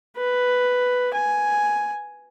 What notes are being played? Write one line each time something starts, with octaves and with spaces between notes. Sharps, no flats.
B4
G#5